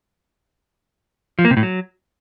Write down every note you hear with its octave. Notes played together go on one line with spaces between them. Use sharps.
F3
A#3
C3
A2
F#3